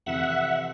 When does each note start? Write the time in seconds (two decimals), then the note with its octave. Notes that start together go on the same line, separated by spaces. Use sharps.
0.06 F2 C3 E3 E5 F#5